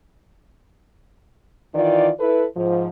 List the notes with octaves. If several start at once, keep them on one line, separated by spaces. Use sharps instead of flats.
D#3 E3 F4 D5
E4 A4 B4
G#2 F3